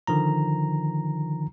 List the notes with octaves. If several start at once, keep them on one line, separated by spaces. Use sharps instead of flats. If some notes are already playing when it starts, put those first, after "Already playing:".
D3 D#3 F3 A#5